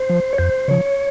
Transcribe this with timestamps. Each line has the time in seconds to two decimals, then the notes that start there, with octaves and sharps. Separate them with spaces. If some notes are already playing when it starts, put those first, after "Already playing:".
Already playing: C5
0.09 F3
0.33 C#5
0.38 F2 C5
0.68 C#3 F3 C#5